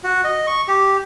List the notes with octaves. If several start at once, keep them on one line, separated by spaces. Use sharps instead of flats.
F#4
D#5
C#6
G4